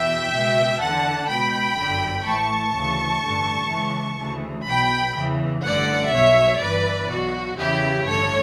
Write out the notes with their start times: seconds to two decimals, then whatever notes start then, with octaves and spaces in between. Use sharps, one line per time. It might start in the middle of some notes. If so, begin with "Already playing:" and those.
Already playing: E2 B2 E5 G5
0.30 C#2 B2
0.79 E2 D3 F#5 A5
1.27 C#2 B2 G5 B5
1.76 G1 F#2 D3
2.25 A1 A2 E3 A5 C#6
2.74 D2 C#3 E3
3.21 A1 G2 D3
3.70 C#2 C#3 E3
4.18 D2 C#3 E3
4.67 B1 B2 G5 B5
5.16 E2 C#3 E3
5.64 A1 G2 D3 D5 F#5
6.12 B1 B2 C#5 E5
6.61 G1 G2 E3 B4 D5
7.10 B1 B2 F#4
7.58 E2 C#3 E3 E4 G4
8.06 A1 G2 D3 A4 C#5